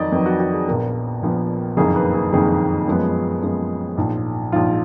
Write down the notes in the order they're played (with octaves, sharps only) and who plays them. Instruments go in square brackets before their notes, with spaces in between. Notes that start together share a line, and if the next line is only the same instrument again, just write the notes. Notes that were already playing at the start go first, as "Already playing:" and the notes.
Already playing: [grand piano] F2 D#3 F#3 D5 D#5
F2 D#3 F#3 B4
F#4
F#4
G#4
A#1 A#2 F3 B3 A#4
A#1 A#2 F3 B3
F#1 F2 D#3 A#3 G#4
B4
G#4
F#1 F2 D#3 A#3 G#4
F#2 F3 G#3 B3
F#2 F3 G#3 B3
A#1 G#2 F3
A#1 G#2 F3 F4